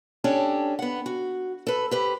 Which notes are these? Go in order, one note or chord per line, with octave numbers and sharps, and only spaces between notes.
C#4 D4 G4 A4
B3 F#5
F#4
A4 B4
G4 B4 C5